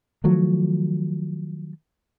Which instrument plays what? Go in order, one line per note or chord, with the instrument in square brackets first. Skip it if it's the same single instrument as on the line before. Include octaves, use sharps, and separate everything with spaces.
[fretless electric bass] D#3 F3 F#3 A3